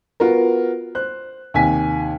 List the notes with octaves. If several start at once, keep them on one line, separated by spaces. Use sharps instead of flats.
B3 F4 F#4 A#4
C5 F#6
D#2 C3 G#5 B6